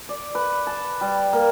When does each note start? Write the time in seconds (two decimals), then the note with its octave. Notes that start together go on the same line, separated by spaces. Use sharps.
0.09 D5
0.35 B4
0.67 A5
1.01 G3
1.33 A#3